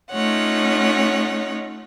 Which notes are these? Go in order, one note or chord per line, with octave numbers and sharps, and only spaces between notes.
A3 C#4 D#4 F4 C#5 F#5